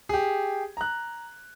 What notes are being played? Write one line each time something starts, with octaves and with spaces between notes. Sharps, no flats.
G4 G#4
A#5 F#6